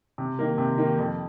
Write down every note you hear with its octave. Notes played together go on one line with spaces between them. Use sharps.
C3
D#3 A#3
C3
D#3 A#3
F2